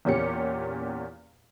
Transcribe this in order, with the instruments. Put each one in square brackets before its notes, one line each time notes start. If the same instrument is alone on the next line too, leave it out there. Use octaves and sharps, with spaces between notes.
[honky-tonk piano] E2 A#2 C#4 G4 C#7